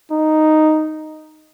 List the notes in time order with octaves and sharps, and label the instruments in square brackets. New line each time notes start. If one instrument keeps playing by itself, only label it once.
[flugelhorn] D#4